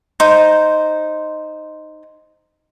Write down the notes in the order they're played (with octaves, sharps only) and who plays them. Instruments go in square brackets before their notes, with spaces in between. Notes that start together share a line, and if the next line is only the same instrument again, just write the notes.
[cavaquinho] D#4 C5